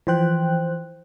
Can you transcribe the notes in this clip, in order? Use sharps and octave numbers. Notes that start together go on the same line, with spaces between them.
E3 F3 C5 G5 F#6